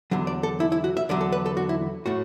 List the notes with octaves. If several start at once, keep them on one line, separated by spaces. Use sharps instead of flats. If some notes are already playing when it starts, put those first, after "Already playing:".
E2 D3 F#3
D5
A4
E4
E4
F#4
E5
E2 D3 F#3 D5
A4
B4
A4
F#4
E4
A2 A3 F#4